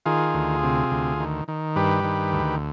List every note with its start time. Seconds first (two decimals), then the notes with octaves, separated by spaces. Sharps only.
0.06 D#3 F4 G#4
0.34 D2
0.63 C3
0.91 D2
1.20 D#3
1.48 D#3
1.76 G2 G4 B4
2.04 D#3
2.32 D2